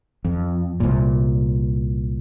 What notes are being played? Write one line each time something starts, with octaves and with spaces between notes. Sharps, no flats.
F2
C2 A#2